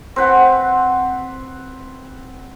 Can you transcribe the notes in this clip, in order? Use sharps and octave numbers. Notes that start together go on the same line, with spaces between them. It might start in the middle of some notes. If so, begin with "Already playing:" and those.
C4 B4 F#5